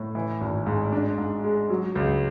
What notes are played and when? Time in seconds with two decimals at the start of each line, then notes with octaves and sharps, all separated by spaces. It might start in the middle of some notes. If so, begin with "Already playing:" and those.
Already playing: A2
0.15 E3
0.41 G#1
0.66 G#2
0.92 D4
1.18 G#2
1.44 G#3
1.70 F#3
1.95 C#2